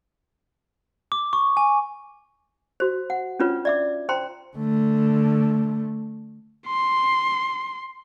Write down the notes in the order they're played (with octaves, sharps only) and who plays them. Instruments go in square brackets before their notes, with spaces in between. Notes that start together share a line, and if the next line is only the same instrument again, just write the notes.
[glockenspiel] D6
C#6
G#5
[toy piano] F#4 C5
F#5
C#4 D4 F4 B4 C#5
D5 E5 D6
C5 G5 A#5 C6
[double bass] D3 A3
[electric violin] C6